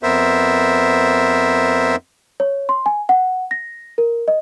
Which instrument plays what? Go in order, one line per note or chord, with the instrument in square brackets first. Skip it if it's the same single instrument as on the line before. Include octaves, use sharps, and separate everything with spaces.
[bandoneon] F2 B3 A#4 C5 E5
[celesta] C#5
C6
G#5
F#5
A#6
A#4
D#5